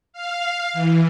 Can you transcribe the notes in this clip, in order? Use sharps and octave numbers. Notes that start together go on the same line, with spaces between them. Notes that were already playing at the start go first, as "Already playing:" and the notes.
F5
E3